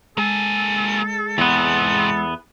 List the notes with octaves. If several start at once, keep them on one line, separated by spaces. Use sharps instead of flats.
G#3 A#3 G#4 A4
E2 G#2 C3 B3